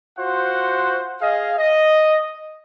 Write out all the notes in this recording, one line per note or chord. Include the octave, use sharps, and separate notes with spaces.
F4 F#4 C5 F#5
G#4 D#5 F5
D#5